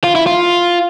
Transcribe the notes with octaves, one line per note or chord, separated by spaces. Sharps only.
F4
E4
F4